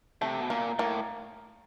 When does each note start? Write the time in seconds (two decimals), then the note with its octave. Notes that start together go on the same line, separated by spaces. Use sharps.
0.22 C3 A3
0.40 B2
0.50 A#2 A#3
0.79 A2 A#3